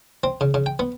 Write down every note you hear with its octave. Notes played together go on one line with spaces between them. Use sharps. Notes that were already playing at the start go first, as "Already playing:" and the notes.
C4
C#3
C#3
G5
B3